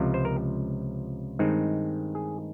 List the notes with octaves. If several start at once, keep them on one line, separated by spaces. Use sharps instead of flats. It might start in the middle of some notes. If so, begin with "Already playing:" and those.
Already playing: C#2 C3 F3
C5
A#4
G2 D#3 G#3 C4 D#4
G#4